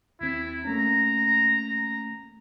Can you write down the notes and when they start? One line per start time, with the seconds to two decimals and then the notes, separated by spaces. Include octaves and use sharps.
0.21 D#2 C4 E4
0.65 A3 A#3 C#4 A#5